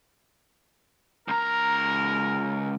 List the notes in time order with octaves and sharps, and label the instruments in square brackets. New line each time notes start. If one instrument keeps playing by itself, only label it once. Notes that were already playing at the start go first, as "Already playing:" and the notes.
[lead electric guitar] C#2 A#5 [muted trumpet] A#4